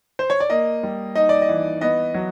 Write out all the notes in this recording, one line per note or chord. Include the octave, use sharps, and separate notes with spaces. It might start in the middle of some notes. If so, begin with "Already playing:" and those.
C5
C#5
D5
A#3 D#5
G3
D#4 D#5
D5
D#5
E3
B3 D#5
F#3